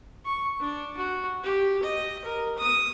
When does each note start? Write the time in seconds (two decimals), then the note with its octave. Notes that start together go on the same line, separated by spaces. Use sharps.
0.25 C#6
0.59 D4
0.97 F#4
1.43 G4
1.82 D#5
2.24 A#4
2.58 D#6